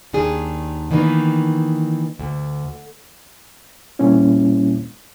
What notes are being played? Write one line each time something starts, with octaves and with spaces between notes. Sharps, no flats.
D#2 D#3 D4 G#4
D#3 E3 A#3 B3 D4 D#4
D2
A#2 G3 A#3 C4 C#4 E4